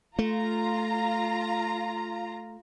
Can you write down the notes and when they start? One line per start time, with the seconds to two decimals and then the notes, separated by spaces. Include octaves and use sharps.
0.19 A3 F4 A#5